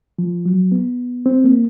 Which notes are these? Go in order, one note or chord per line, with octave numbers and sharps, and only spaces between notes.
F3
F#3
B3
C4
A#3